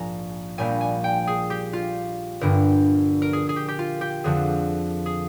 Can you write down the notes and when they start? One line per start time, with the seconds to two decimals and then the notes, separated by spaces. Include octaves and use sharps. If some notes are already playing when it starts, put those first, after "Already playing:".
Already playing: A#1 G#2 G#5 A#5
0.58 A#1 A#2 G3 A#3 G#5
0.81 G#5
1.04 G5
1.27 G#4
1.50 G4
1.73 F4
2.41 G1 G2 D3 A#4
3.22 A#4
3.33 G#4
3.49 G#4
3.56 G4
3.68 G4
3.79 F4
4.01 G4
4.24 F2 D3 F3 G#4
5.06 G#4